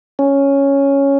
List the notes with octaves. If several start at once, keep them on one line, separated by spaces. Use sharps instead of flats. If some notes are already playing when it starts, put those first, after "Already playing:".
C#4